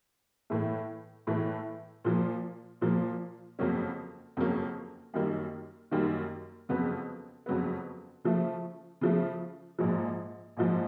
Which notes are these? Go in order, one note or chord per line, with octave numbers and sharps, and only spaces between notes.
A2 E3 A3
A2 E3 A3
A#2 F3 A#3
A#2 F3 A#3
F2 C#3 F#3 A#3 C#4
F2 C#3 F#3 A#3 C#4
F#2 D#3 G3 A#3 D#4
F#2 D#3 G3 A#3 D#4
F2 C#3 F#3 B3
F2 C#3 F#3 B3
C#3 F3 A3
C#3 F3 A3
A#1 G#2 F3
A#1 G#2 F3